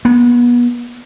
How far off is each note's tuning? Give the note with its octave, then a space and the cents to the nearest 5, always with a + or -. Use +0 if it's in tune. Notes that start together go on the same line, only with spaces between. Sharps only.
B3 -35